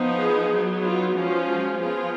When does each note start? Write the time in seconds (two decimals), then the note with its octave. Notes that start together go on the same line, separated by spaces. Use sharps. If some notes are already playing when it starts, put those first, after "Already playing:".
Already playing: F3 B3 D#4
0.19 G#4
0.51 F#3 B3 D#4
0.82 F4
1.14 F3 G#3 C#4 F4 F#4
1.77 F3 B3 F4 G#4